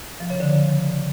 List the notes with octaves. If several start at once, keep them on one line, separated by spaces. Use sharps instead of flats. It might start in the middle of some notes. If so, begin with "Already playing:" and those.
F3
C#3
D3